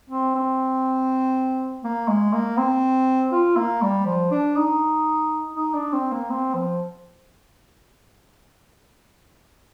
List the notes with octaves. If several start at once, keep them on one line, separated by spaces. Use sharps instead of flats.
C4
C4
A#3
G#3
A#3
C4
F4
A#3
G3
F3
D4
D#4
D#4
D4
C4
A#3
C4
F3